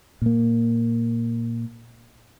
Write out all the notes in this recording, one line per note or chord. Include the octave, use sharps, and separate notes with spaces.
A#2 A#3